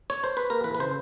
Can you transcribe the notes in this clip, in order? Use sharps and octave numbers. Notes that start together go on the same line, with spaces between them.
C#5
C5
B4
A#3 A#4
E3 B4
B4
C#3 C5